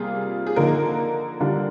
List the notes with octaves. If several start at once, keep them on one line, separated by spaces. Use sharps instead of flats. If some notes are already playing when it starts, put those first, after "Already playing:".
Already playing: C3 G3 A#3 F4 G#4
G#4
D3 F3 A#3 D#4 A#4
D3 G3 D4 F4